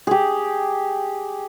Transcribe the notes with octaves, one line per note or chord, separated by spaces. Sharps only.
G4 G#4